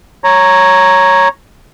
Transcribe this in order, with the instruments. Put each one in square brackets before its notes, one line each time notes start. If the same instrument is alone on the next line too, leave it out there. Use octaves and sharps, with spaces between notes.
[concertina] C#5 A#5